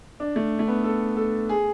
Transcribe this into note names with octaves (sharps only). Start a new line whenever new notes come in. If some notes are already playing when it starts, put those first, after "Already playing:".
D4
A3
A3
B3
A4
A4
G#4